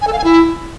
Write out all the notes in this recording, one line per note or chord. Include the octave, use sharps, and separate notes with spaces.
G#5
A4
F5
G#5
E4